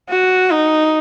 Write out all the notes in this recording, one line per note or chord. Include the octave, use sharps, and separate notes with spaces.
F#4
D#4